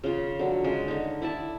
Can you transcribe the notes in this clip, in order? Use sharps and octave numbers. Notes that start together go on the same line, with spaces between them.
C#3 F4
D3 F#3
C#3 G#3 C#4
D3 D#4
E4 D5 A5